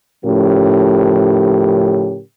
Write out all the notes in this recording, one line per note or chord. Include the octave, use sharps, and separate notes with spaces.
A2 C#3 F3 C#4 G4 A#4